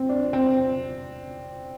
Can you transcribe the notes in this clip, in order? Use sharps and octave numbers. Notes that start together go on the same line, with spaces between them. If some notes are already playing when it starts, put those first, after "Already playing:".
Already playing: C4
D4
C4